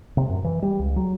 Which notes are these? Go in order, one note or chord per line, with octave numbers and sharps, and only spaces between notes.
C3
F#2
E3
G3
C#2
F#3